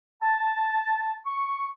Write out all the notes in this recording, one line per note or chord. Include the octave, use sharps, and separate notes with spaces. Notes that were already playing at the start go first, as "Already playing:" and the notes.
A5
C#6